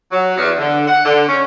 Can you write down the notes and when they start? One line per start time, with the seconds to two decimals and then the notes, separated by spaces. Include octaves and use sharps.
0.11 F#3
0.37 E2
0.57 D3
0.87 F#5
1.04 D3
1.28 C#4